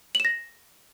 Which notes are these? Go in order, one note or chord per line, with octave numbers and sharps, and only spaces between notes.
A#6 E7 F#7